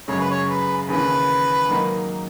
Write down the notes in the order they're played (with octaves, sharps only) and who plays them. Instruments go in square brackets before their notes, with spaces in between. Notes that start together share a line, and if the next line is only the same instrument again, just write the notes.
[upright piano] F#2 C#3 G#3 [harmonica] C#5
[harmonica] B4
C#5
B4
[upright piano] D#2 C#3 E3 [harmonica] B4
[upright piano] G#2 D#3 F#3 A#3 D#4